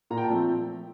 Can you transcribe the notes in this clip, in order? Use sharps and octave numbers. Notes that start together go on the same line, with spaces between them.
A#2 A#5
G5
A5
F3 A3 C4